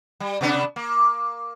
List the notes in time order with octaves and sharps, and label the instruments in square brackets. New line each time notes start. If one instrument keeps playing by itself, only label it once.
[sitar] G3
C3 B3 D4
A#3